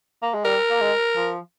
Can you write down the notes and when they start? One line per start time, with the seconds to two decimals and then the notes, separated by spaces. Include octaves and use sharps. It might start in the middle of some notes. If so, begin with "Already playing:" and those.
0.23 A#3
0.34 G#3
0.45 G3 A#4
0.70 A#3
0.81 G#3
1.16 F3